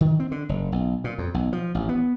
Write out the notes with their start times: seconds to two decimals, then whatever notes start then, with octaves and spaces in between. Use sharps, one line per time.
0.01 D#3
0.20 C4
0.31 D3
0.49 F#1
0.72 B1
1.04 A#2
1.18 F2
1.34 B1
1.53 F3
1.75 A1
1.89 B3